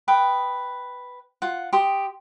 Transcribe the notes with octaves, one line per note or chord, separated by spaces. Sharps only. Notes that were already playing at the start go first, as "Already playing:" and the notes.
B4 G5 D#6
F4 F#5
G4 C6 D#6